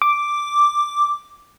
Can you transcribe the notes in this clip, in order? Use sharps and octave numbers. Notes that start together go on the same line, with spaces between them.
D6